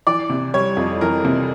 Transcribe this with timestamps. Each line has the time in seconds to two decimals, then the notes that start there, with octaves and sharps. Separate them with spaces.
0.07 E3 D5
0.29 C3
0.54 G3 C#5
0.77 F2
1.01 E3 A#4
1.25 C3